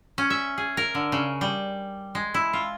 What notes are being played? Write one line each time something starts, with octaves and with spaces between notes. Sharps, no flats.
C#4
E5
G#4
A#4
D3
C#3
G3
G#3
E4
F4